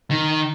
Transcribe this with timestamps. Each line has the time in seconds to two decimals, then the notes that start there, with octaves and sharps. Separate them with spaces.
0.11 D#3